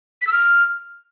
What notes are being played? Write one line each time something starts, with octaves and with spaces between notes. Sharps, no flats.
B6
E6
F6